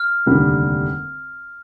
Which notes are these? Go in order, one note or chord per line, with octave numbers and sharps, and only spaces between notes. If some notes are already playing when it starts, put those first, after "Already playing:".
Already playing: F6
F1 D#2 D3 G3 D4